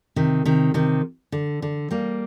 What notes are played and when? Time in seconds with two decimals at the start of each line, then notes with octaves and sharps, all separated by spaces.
0.16 C3 D#3
0.45 C3 D#3
0.74 C3 D#3
1.32 D3
1.62 D3
1.91 G3 A#3